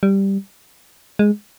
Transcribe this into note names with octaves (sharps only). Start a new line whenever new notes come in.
G3
G#3